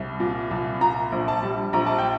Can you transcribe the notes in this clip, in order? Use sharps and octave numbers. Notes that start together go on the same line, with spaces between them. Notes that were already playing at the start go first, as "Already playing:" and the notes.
Already playing: C2 G3
A#2
C2
A#2 A#5
A#1
A5
G3
A#1 A#5
A5
G5